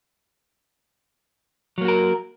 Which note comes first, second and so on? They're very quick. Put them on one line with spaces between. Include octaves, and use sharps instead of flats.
F#3 A#3 F#4 A#4